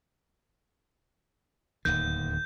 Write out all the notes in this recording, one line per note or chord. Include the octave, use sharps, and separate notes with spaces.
D1 D#2 D#3 G6